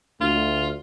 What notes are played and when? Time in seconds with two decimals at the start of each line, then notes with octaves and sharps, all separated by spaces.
0.21 D2 F4